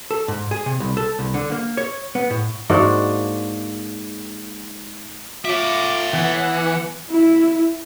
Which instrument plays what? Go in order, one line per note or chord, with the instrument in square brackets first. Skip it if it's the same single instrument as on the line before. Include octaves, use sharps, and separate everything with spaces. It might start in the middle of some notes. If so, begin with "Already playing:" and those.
[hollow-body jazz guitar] A4
G#2
G#4
C3
C2
A4
C2
D3
A#3
C#5
B3
A2
[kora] G#2 A#3 D4 F#4
[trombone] F4 [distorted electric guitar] C#5 E5 [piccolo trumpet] D6
[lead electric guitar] E3 [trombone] B3 [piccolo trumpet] F#5
[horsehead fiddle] E4